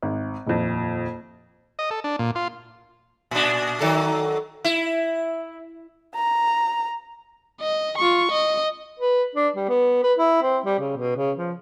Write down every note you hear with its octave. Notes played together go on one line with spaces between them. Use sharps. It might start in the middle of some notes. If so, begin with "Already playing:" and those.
G#1
D#1 F2
D#5
A4
D4
A#2
F4
A#2 D4
D#3 F#3 A4
E4
A#5
D#5
F4 C#6
D#5
B4
D4
G3
B3
B4
E4
C4
G3
C#3
B2
C#3
F3